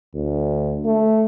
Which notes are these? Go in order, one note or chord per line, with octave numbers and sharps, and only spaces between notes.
D2
A3